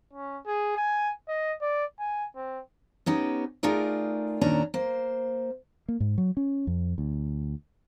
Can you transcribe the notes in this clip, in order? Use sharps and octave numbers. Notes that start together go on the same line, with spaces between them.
C#4
G#4
G#5
D#5
D5
G#5
C4
B3 C#4 D#4 G4
A3 D#4 F4 G#4 A#4 D5
D#2 A#2 D#3 C#4 D4 A#5
A#3 C5
A#3
G#2
F#3
C#4
F2
D2